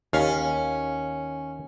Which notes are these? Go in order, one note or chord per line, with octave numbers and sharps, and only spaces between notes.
D#2 C#4 F5